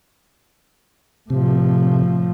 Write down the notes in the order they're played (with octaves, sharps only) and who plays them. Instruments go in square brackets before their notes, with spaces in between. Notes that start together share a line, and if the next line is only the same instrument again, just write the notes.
[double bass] A2 F3 [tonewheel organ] C3